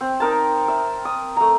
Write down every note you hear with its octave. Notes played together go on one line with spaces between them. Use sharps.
C4
D#4 A#4 A5
E5
D#6
A3 A#5